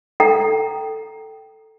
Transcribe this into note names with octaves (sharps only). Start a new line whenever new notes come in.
A4 G5 A#5